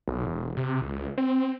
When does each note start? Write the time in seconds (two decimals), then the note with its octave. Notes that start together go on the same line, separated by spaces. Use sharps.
0.08 B1
0.26 E1
0.57 C3
0.82 C#2
1.18 C4